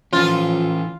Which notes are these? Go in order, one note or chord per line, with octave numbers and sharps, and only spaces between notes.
E3 F3 C#4 F4